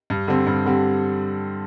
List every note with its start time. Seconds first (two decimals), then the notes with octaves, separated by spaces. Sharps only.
0.10 G2
0.27 D3 G3 C4
0.47 G2
0.65 D3 G3 C4